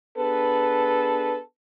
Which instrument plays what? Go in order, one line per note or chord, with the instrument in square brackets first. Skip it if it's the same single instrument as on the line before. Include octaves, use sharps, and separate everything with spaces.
[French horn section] B3 D4 G#4 A4 B4